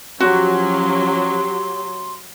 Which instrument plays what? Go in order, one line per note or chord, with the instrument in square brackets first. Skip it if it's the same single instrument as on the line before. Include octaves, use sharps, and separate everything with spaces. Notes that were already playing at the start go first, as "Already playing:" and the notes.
[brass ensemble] F3 C#4 [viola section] F#3 G4 [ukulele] F#4 [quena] C6